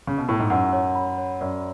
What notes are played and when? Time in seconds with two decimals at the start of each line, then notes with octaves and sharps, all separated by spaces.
0.07 C#3
0.18 B2
0.29 A2
0.39 G#2
0.50 F#2 F#5
0.73 C#5
0.95 B5
1.18 C#5
1.41 F#2 D5